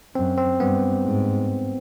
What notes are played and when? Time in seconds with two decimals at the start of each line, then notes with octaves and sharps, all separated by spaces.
0.15 F#2 C4
0.38 C4
0.60 G2 B3
1.05 G#2